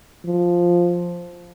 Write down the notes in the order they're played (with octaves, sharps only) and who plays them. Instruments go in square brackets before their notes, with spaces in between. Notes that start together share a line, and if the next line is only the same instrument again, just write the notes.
[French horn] F3